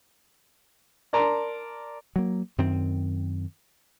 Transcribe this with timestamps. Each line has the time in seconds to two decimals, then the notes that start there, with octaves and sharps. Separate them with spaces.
1.13 A#4 D5 A5 A#5 C6
2.16 F#3 A#3
2.58 F#2 D#3 C4